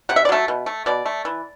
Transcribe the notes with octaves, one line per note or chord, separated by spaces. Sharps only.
C3 F#5
E5
D5
F#3 A3 E5
B2
A3
B2 D5
A3
E3